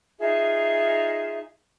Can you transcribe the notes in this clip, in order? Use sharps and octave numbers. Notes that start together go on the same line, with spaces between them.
D#4 F4 G#4 E5